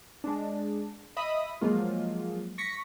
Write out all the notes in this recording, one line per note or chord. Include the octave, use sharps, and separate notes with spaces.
G#3 D4
D#5 E5 B5 D#6
F3 F#3 G#3 A#3 F4
C#6 A#6 B6 C#7